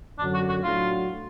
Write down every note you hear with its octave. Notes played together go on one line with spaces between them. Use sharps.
F#2 D3 F#3 D4
F#4
F#4
A2 F#3 A3 D4 F4 F#4